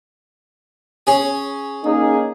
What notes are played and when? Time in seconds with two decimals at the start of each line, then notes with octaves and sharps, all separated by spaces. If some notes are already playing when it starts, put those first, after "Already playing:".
1.07 C#4 G#4
1.84 A#3 C#4 D#4 G#4